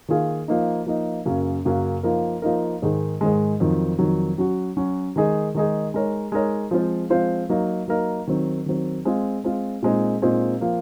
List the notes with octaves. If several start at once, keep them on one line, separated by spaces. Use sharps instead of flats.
D#3 A#3 F4 G#4
F3 A#3 D#4
F3 A#3 D#4
F#2 C#3 F#3 A#3 C#4
F#2 C#3 F#3 A#3 C#4
F3 A#3 D#4 A#4
F3 A#3 D#4 A#4
G#2 D#3 G#3
G#2 D#3 G#3
F2 D#3 F#3
F2 D#3 F#3
F#3 C#4 F#4
F#3 C#4 F#4
D#3 G#3 D#4 G#4
D#3 G#3 D#4 G#4
G#3 D#4 A#4 C#5
G#3 D#4 A#4 C#5
F3 G#3 C4 F4 C5
F3 G#3 C4 F4 C5
F#3 A#3 D#4 A#4
F#3 A#3 D#4 A#4
D#3 F#3 C4
D#3 F#3 C4
G#3 C4 F4
G#3 C4 F4
A#2 G#3 C4 D#4
A#2 G#3 C4 D#4
F3 A#3